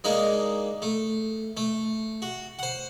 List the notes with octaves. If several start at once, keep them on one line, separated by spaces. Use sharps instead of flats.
G#3 A#3 D4 D#4
A3
A3
F#4
C5 F#5